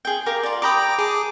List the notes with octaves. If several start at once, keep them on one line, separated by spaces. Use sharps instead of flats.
G#4 G5
G4 A#4 F5
F4 D5
G4 G5 A#5 B5 D6 D#6
G#4 A5 D6